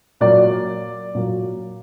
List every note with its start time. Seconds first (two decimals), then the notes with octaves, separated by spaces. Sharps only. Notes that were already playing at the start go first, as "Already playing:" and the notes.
0.20 A#2 F#3 A#3 D5
1.15 A#2 F#3 A#3